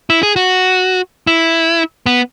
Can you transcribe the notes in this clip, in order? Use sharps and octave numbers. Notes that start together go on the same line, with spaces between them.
E4
G#4
F#4
E4
B3